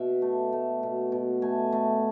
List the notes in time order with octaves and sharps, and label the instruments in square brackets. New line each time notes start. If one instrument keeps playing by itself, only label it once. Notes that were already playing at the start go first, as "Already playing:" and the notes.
Already playing: [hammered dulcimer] B2 E5
A3
A3
B2
B2
A3 G#5
A3